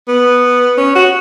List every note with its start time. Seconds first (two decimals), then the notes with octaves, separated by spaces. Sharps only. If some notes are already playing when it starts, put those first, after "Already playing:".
0.08 B3
0.78 C#4
0.95 F#4